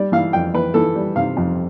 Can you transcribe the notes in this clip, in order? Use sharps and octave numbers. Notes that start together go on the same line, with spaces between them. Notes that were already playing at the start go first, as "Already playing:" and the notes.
Already playing: G3 D5
E3 F5
F2 G5
E3 B4
E3 A4
G3
C3 F5
F2